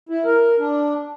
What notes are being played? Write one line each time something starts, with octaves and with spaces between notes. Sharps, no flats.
E4
A#4
D4